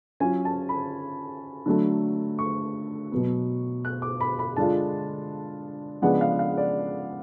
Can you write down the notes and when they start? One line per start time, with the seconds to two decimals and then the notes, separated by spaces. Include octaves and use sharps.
0.20 F#3 C#4 F4 G#5
0.45 A5
0.69 B5
1.66 D3 F#3 A3
2.39 C#6
3.12 B2 F#3 B3
3.85 F#6
4.02 D6
4.21 B5
4.39 B5
4.56 D3 G#3 D4 F4 A5
6.02 C#3 F3 G#3 B3 D4 F#5
6.21 F5
6.39 F5
6.57 D5